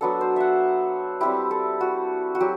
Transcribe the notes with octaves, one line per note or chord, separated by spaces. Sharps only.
F#3 B3 D4 A4
C5
E5 F#5
G3 C4 E4 G4
A4
F#4
F#4
F#3 G4